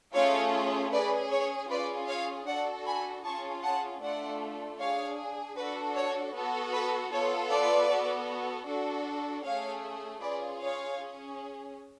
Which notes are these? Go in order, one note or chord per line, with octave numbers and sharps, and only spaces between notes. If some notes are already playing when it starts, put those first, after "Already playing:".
A3 C#4 F4 G#4 C#5 F5
C#4 G#4 B4 D5
C#5
C#4 F4 G#4 B4 D5
C#5 F5
D4 F#4 A4 D5 F#5
G#5 B5
C#4 F4 G#4 A5 C#6
F#5 A5
A3 D4 F4 A4 D5 F#5
D4 G#4 C#5 F5
D4 F#4 A4 B4
C#5
B3 F#4 A4
B4
B3 F4 A4 C#5
B4 D5
B3 F#4 A4
D4 F#4 A4
A3 C#4 G#4 C#5 F5
C#4 F4 G#4 B4 D5
C#5 F5
C#4 G#4